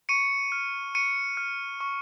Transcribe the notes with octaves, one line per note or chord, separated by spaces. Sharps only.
C#6 C#7 D#7
F6
C#6 C#7 D#7
F6
C#6